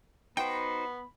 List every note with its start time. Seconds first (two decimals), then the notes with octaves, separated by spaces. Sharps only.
0.37 B3 D#4 F#4 C5 G5 B5